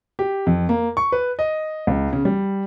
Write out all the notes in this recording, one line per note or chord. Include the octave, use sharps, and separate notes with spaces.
G4
F2
A#3
C#6
B4
D#5
C#2
C#3
G3